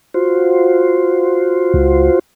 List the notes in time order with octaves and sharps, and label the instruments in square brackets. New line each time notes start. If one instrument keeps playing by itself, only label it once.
[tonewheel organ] F4 F#4 C5
[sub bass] C#2